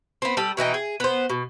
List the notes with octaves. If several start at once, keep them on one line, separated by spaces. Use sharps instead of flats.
B3 C4
G3 A4
B2 E3 D#4 G5
G#4
B3 C5
B2